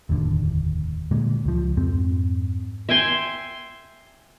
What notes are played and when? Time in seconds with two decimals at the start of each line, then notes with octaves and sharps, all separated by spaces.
0.09 F1 D#2 A2 D3
1.11 A#2 D3 G#3 A#3
1.45 C#2 F3
1.77 F2 G#2 C4
2.89 E5 G5 G#5 C6